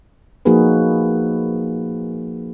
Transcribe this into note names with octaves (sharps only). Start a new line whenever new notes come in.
F3 A#3 D#4 F#4 G#4 B4